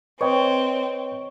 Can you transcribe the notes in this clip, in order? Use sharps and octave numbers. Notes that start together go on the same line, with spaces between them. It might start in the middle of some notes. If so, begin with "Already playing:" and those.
C4 B4 C#5 D#5 G5